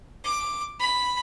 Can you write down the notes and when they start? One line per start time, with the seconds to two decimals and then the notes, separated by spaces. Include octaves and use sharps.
0.24 D6
0.80 B5